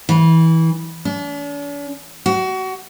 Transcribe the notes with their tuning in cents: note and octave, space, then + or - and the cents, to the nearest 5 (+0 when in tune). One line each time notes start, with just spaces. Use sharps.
E3 -20
D4 -45
F#4 +25